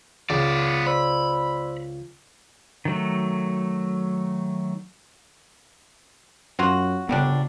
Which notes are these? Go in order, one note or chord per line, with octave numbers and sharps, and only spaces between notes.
C#2 B3 D5
C5 D5 B5 E6
D#3 F#3 A3
F#2 F#3 F4 F#4
G1 C#3 F#3 G3 B3 D4